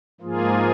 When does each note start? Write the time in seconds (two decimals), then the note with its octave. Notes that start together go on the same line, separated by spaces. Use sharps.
0.20 G#2 F3 A#3 F4 G#4